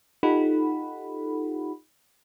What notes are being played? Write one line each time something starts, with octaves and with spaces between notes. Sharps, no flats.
D#4 F4 G4 A4 F#5 B5